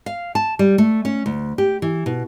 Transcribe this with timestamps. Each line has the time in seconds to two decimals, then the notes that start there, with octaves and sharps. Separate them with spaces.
0.06 F5
0.35 A5
0.59 G3
0.78 A3
1.05 C#4
1.26 D2
1.58 G4
1.82 E3
2.06 B2